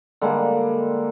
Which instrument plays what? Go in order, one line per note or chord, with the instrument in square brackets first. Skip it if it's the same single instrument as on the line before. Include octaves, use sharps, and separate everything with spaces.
[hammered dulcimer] D3 G3 G#3 A#3